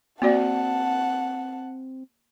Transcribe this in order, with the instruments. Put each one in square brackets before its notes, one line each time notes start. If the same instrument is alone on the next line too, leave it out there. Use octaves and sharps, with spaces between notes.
[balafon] A#3 F#4 D5 [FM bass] C4 [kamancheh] F#5 A5